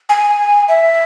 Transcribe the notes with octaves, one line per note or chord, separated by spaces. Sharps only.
G#5
E5